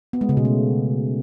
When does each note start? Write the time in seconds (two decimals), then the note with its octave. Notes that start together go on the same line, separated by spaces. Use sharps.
0.13 B3
0.21 G#3
0.29 C#3
0.37 B2
0.45 A3